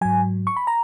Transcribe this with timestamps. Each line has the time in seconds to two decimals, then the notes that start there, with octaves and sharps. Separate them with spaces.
0.01 G#2 F#3 G#5
0.47 C#6
0.57 B5
0.67 A#5